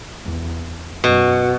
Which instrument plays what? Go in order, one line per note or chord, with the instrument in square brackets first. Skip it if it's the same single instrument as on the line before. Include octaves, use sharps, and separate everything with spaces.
[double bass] E2
[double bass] F#2 [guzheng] B2